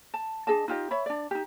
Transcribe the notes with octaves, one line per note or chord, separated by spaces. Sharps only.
A5
D4 G#4 D#5 A5
D#4 F4 G4 D#5
C#5 E5 B5
D4 D5
D#4 G4